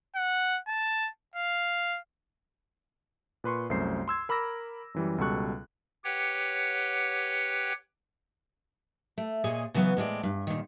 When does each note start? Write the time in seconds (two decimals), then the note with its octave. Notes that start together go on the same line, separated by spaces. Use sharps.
0.16 F#5
0.68 A5
1.36 F5
3.44 A#2 B4 C6 C#6
3.70 C2 F#2 A3 C5 C7
4.08 C6 E6 G#6
4.29 A#4 B5 D6 E6 A#6
4.94 F#2 E3 G3
5.18 C#2 B2 G3 A4 C#6 F#6
6.04 G4 B4 C#5 F#5 G5
9.18 A3
9.44 A#2 G#4 C#5 D#5
9.74 C#3 E3 F#3 B3
9.97 A2 G#3 C4 D5
10.23 G2
10.47 A#2 D#3